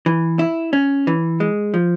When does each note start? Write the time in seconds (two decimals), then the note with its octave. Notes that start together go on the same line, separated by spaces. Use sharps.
0.06 E3
0.39 E4
0.73 C#4
1.07 E3
1.40 G#3
1.74 F3